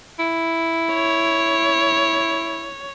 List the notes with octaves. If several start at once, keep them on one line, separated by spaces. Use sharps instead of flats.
E4
C#5